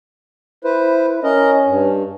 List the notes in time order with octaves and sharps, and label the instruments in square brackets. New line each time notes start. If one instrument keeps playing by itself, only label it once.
[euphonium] E4 [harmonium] B4 C5
[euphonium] C#4 [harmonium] A#4 D#5
[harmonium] G2